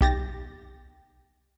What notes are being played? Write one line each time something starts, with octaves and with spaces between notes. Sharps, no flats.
B1 G4 A6 A#6